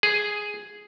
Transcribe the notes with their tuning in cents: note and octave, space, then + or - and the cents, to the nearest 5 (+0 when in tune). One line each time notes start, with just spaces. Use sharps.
G#4 +0